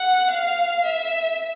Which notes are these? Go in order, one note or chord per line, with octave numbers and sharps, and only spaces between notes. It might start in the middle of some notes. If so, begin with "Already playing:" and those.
Already playing: F#5
F5
E5